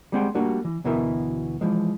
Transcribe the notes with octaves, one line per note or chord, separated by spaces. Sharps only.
G3 G#3 C4 G#4 F#5 C6
G3 A3 A#3 D4 F#4
E3
D2 B2 E3 B3 A#4 E5
E3 F3 G#3